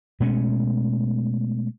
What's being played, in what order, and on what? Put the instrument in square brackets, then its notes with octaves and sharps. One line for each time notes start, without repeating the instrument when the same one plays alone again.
[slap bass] B2 G#3 A3 C#4